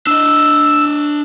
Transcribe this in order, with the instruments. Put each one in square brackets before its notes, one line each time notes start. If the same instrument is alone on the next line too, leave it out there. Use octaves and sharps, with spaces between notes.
[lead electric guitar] D4 D#5 [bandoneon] E6